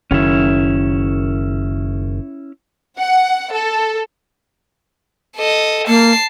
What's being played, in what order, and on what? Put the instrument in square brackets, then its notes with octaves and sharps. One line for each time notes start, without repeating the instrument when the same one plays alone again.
[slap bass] F#1 D#3 [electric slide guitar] C#4 E4
[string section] F#5
A4
[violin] A4 D#5
[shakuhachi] A#3 [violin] A5 C7